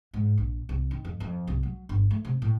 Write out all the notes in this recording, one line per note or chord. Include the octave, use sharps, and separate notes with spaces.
G#2
A#1
C2
D#3
F2
F2
C2
F#3
G1
A3
C3
A2